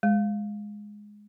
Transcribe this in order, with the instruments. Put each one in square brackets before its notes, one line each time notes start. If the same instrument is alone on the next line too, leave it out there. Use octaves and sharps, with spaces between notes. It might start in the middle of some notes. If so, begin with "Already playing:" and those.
[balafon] G#3